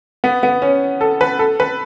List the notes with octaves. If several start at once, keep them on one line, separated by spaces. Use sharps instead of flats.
B3
B3
C#4
A4
B4
A4
B4